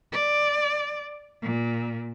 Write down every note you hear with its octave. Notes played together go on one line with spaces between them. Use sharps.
D5
A#2